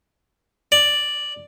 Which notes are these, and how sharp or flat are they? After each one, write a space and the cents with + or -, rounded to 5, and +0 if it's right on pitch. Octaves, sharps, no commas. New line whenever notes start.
D5 +0